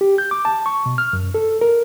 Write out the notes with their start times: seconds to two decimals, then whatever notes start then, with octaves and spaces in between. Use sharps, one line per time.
0.01 G4
0.18 G6
0.31 D6
0.45 A5
0.66 C#6
0.86 B2
0.98 F6
1.13 F#2
1.34 A4
1.61 A#4